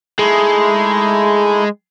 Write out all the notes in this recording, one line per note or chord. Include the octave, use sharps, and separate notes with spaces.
G#3 A3 D#4 E4